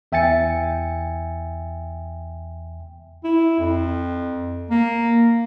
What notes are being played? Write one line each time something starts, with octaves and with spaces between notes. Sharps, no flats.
E2 E5 G5 G#5 A6 C#7
E4
F2
A#3